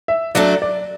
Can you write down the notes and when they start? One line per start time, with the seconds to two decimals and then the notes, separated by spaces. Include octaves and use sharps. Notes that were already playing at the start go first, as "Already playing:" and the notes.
0.08 E5
0.35 F#3 A3 D4 A4 D5
0.62 D5